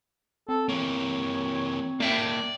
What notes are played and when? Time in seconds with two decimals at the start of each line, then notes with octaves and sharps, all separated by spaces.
0.49 C4 A4
0.69 E3 A#3 C#5
2.00 A#3 D5 E5 G5